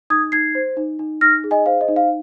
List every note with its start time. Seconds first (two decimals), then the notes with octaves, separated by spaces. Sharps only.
0.10 D#4 D#6 G#6
0.32 D#4 G#6 C7
0.55 C5
0.77 D#4
0.99 D#4
1.21 D#4 F6 A#6
1.44 G#4
1.51 D#5 G#5
1.66 C5 F5
1.81 D#5
1.88 D#4
1.96 F5